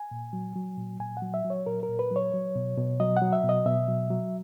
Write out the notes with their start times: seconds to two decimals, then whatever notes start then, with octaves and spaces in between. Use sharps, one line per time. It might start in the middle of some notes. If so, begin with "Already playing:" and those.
Already playing: G#5
0.11 A#2
0.33 F#3
0.56 F#3
0.78 A#2
0.99 A#2 G#5
1.17 F#5
1.22 F#3
1.34 E5
1.45 F#3
1.50 C#5
1.66 A#2 A#4
1.83 A#4
1.89 A#2
1.99 B4
2.11 F#3
2.16 C#5
2.34 F#3
2.56 B2
2.77 B2
3.00 F#3 D#5
3.17 F#3 F#5
3.33 E5
3.44 B2
3.49 D#5
3.66 B2 E5
3.88 F#3
4.10 F#3